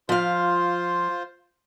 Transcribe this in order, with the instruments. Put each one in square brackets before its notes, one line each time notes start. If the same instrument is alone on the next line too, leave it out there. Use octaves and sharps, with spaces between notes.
[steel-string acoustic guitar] F3 F5 [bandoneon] F4 C5